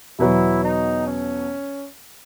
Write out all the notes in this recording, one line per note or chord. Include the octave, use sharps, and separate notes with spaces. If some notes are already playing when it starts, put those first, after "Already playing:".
E2 B2 F#3 B3 E4
D#4
C#4